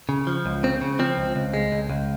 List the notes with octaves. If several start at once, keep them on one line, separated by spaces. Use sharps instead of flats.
C#3
F3
C#2
C#3 C4
C#3
F3 C4
C#2
C#2
G#3
C#2
C#2